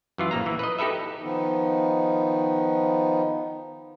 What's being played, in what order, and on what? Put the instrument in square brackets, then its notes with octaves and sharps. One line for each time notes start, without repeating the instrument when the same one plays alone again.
[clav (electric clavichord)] F#2 E3 F4
A#1 A#3 A#5
E3
B4 D#5
D#4 G4 A4 B4 E5
[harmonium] D#3 F3 B3 D#4